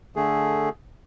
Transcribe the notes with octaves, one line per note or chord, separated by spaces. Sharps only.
D3 A3 G#4